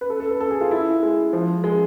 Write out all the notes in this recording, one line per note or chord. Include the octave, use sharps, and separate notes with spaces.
B4
A4
A4
B4
A4
G#4
F4
E4
G#3
F3
G#3